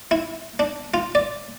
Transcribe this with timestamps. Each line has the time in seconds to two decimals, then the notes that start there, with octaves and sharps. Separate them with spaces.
0.11 E4
0.59 D4
0.94 F4
1.15 D5